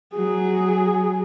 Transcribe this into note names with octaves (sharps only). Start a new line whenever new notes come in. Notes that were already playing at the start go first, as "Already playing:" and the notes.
F#3 G#4